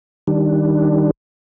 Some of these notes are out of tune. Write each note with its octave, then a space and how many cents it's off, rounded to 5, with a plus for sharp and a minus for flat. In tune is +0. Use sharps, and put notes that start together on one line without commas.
D#3 +0 G3 +0 D4 +0